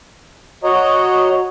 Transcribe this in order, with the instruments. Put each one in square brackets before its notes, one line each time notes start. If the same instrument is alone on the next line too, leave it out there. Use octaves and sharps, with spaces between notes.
[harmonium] F#4 C#5 D#5 A#5